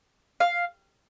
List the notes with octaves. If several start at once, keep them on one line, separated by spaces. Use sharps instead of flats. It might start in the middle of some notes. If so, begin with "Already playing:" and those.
F5